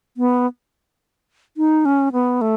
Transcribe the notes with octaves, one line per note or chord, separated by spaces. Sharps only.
B3
D#4
C#4
B3
A3